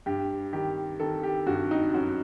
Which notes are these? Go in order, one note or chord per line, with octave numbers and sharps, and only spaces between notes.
G2 G4
D#3 G4
D#3 A4
G4
G2 F#4
D#4
F#2 F#4